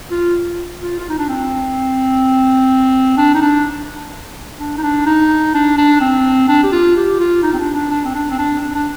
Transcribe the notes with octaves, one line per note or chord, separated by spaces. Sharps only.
F4
F4
F4
D#4
D4
C4
D4
D#4
D4
D4
D#4
D4
D#4
D4
D4
C4
D4
G4
F4
G4
F4
D#4
C4
D4
D4
D4
C4
D4
C4
D4
D4
D4